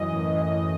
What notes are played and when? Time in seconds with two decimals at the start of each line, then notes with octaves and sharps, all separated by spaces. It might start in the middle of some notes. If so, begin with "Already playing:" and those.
Already playing: F#2 E3 D#5
0.13 A2
0.30 E3
0.50 A2